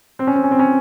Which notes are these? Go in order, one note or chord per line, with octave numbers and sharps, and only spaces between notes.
C4
C#4
C4
C#4
C4
C#4